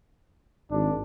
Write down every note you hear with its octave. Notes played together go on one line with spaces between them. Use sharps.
G#1 D4